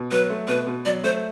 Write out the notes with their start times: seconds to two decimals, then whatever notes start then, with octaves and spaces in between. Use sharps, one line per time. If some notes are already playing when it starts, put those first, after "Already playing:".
Already playing: B2
0.12 F#3 B4
0.30 A3
0.48 B2 B4
0.67 B2
0.85 F#3 D5
1.04 A3 C5